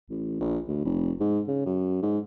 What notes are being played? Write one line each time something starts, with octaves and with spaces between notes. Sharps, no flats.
A1
A#1
D2
F1
G#2
C#3
F#2
G#2